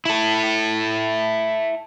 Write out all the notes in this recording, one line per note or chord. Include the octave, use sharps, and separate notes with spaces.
E4 A4